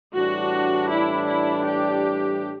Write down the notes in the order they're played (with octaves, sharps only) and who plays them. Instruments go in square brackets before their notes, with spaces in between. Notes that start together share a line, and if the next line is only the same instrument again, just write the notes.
[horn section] A2 E3 G3 D4 [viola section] F#4
[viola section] E4
E4
G4